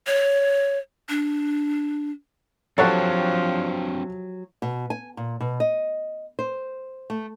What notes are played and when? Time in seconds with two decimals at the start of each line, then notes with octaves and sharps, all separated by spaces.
0.07 C#5
1.09 D4
2.78 F3 F#3 C4 D4 G4 A4 C#5 F#5
4.62 B2
4.90 G#5
5.17 A#2
5.40 B2
5.60 D#5
6.39 C5
7.10 A3